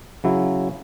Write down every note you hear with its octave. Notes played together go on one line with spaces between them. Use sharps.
C#3 F#3 E4